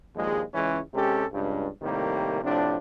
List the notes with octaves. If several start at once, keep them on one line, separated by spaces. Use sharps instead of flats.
A#1 D#2 F3 G#3
C#2 E3 G#3 C#4
C3 G#3 C#4 G4 A4
C#2 G2
A2 C3 D#3 G3 A#3
A2 C3 F3 D4